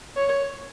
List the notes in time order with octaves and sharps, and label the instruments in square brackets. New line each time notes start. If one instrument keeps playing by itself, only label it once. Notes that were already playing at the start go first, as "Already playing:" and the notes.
[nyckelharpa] C#5